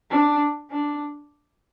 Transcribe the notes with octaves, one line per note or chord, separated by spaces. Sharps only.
D4
D4